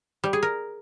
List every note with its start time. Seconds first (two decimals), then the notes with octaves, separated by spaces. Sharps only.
0.24 G3
0.33 G#4
0.43 A#4